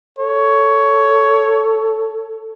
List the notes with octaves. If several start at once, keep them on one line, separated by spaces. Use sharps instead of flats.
A4 C#5